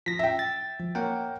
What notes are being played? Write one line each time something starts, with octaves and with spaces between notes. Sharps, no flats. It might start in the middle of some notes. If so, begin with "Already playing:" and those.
F3 A#6 B6
E5 G5
A6
F3
A#3 C#5 F#5 G5